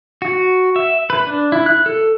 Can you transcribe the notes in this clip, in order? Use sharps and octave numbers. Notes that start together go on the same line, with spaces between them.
F#4
E5
B4
D4
E4
F#6
A4